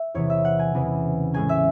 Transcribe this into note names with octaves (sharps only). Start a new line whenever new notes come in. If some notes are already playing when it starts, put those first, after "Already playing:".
Already playing: E5
E2 C3 E3 C#5
E5
F#5
G#5
E2 C#3 E3 C4
A2 G#3 C#4 G#5
E5